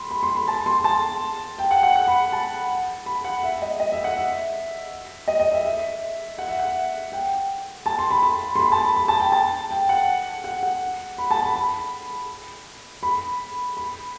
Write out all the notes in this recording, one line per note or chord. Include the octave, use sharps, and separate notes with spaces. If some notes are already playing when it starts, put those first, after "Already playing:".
Already playing: B5 C6
B5
C6
B5
A5
C6
A5
G5
F#5
F#5
F#5
B5
A5
B5
F#5
E5
D#5
D#5
E5
F#5
E5
D#5
D#5
E5
E5
F#5
E5
F#5
G5
A5
C6
B5
B5
C6
B5
A5
B5
B5
A5
G5
A5
G5
F#5
F#5
F#5
B5
A5
B5
B5
B5
B5